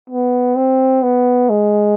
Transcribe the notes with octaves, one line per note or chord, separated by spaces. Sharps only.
B3
C4
B3
G#3